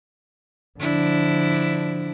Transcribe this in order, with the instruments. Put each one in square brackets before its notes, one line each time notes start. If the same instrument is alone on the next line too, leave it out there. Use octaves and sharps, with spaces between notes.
[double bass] D3 F3 [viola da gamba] D4 E4